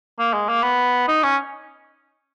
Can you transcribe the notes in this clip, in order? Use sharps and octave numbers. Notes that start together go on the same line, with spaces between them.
A#3
G#3
A#3
B3
D#4
C#4